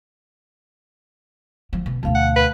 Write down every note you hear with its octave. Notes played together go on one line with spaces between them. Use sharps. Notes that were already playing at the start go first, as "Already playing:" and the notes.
F3
B2
D2 B2 A3 F5
F#5
B4